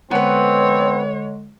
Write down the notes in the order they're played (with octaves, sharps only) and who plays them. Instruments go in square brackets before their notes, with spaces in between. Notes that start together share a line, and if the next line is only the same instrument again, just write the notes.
[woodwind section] D3 G#3 [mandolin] B3 B4 [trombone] C4 [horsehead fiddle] C#5